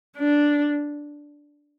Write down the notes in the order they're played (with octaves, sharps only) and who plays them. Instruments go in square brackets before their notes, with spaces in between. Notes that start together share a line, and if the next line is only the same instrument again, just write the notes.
[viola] D4